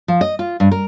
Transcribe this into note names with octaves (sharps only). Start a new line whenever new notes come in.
F3
D#5
F4
G2
A#4